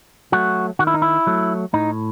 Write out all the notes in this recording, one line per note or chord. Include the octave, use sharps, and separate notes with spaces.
F#3 A3 F#4
D#3 F#4
E4
D#4
E4
F#3 A3
A2 D#4